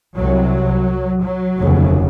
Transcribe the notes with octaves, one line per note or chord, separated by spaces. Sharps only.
C2 C3 F#3
F#3
F1 D#2 C#3